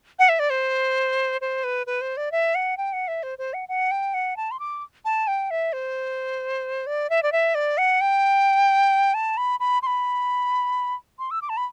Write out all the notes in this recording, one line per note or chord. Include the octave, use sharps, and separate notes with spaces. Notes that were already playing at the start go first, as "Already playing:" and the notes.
F#5
E5
D5
C5
C5
B4
B4
C5
D5
E5
F#5
G5
F#5
E5
C5
C5
F#5
F#5
G5
F#5
A5
C6
D6
A5
G5
E5
C5
D5
E5
D5
E5
D5
F#5
G5
A5
B5
B5
C6
B5
C6
E6
D6
A5
B5